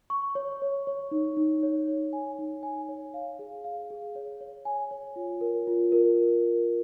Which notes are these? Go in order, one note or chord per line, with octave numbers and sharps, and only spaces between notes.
C#6
C#5
C#5
C#5
D#4
D#4
C#5
C#5
G#5
D#4
G#5
C#5
F5
G#4
F5
G#4
C#5
C#5
G#5
C#5
F4
A#4
F4
A#4